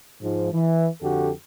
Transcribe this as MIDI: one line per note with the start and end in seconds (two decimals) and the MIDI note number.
0.22 0.53 44
0.22 0.53 53
0.53 0.87 52
1.02 1.30 41
1.02 1.30 50
1.02 1.30 66
1.02 1.30 67
1.02 1.30 69